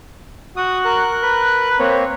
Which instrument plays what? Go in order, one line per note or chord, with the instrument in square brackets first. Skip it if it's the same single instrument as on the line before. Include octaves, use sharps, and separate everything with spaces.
[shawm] F#4 [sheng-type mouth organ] D#6
[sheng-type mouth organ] A#4 F#6
[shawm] B4
[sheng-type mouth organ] A#3 C4 C#5